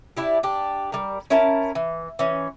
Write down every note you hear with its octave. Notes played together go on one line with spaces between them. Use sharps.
D4 E4 G4
D4 G4
G3 A#4
C#4 E4 A#4 A5
E3
E3 C#4